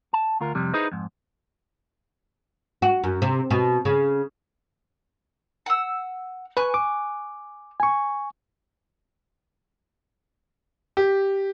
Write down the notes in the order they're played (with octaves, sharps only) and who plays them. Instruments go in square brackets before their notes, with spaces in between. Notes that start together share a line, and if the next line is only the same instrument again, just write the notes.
[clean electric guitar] A5
D2 F4 A#4
F2 C3 G3
D#4 E4 G#4 B4 C5 D#5
F2 G#2
[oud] F#4
F#2
C3
B2
C#3
[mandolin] F#5 E6
[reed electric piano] B4 [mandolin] G#5 C#6 F#6
[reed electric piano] D6
G#5 C#6
[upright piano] G4